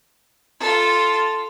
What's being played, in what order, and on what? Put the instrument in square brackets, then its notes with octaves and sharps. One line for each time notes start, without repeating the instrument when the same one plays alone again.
[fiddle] F4 A4